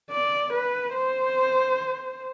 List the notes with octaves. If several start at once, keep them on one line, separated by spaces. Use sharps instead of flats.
D5
B4
C5